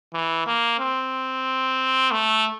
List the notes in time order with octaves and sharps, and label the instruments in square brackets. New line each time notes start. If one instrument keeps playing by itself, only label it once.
[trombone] E3
A#3
C4
A3